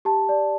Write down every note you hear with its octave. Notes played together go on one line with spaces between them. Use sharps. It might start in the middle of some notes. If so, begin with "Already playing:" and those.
G4 A5
D5